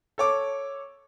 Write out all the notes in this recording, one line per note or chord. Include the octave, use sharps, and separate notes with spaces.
A4 C#5 D6